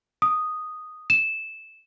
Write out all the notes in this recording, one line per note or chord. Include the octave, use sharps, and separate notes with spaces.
D#6
E7